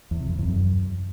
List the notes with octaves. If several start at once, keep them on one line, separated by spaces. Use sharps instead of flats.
E2
C3
F2
E2
F#2